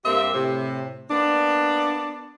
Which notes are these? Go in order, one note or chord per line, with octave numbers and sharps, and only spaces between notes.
G2 A#3 C4 G4 E5
A2 C3
A#3 B3 D4